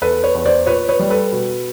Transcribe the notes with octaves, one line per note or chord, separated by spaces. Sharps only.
E2 A4 B4
B4 C#5
E2
C5 D5
A#2 B4 C#5
B4 C#5
G3
A4 B4
B2